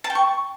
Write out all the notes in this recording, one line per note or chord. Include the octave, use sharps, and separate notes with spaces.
A5
G5
C#6